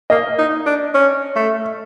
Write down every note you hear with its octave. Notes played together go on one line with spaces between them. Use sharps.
A#3 D#5
D#4
D4
C#4
A3